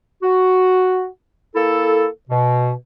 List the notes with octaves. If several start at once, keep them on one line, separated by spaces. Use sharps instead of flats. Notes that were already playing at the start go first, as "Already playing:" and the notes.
F#4
A#3 E4 A4
B2